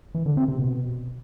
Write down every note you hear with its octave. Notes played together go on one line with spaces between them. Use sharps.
E3
D3
C4
C3
B2